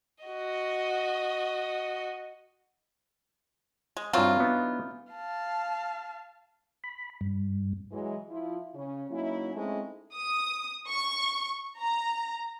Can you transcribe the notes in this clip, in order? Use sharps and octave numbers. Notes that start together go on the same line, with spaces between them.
F#4 D#5
G#3
G2 E3 F#3 C4 F4
B3 D4 D#4
F5 A5
B5
G2
E3 F#3 G#3
F3 E4 F4
C#3 C#4
F#3 A#3 C#4 D#4 E4
G#3 A3 C4 C#4 D#4 E4
D#6
C#6
A#5